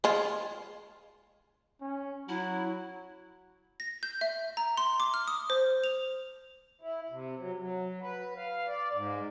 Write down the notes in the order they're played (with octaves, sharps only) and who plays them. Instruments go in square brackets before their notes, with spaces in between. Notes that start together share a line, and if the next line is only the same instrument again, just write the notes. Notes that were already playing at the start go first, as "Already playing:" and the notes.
[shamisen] G#3 F4
[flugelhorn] C#4
[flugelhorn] F#3 [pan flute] E4
[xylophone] A#6
G6
E5
A#5
C6
D6
F6
D#6
C5
F7
[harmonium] E4
C3
F#3
F#3
B4
F5
D5
G#2